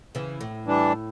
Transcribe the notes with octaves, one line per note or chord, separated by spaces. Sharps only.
C#3 E3
A2
E3 G3 D4